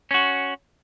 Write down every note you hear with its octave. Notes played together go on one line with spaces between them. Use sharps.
C#4 F#4